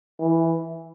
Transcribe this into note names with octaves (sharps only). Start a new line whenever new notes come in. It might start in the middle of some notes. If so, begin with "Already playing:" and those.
E3